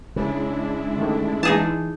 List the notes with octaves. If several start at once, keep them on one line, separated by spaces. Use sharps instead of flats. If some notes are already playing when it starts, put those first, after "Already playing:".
C#3 G#3 D4 E4
D3 D#3 A3
E3 D#4 G#4 A5